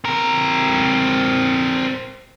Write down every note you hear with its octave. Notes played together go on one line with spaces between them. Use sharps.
C4 A#4